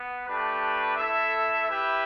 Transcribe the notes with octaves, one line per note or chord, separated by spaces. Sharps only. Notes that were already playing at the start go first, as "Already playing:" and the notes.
Already playing: B3
A3 D4 G4 B4
A3 E4 A4 E5
E4 G4 B4 E5